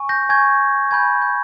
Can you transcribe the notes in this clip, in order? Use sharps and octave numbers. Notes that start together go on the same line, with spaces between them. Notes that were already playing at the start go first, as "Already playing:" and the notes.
Already playing: G#5 C#6
G6 A#6
G#5 C#6 G6 G#6
G#5 B5 G6 G#6
G6